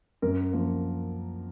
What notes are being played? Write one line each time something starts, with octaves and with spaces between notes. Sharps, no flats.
F#2 A#4
F3 A#3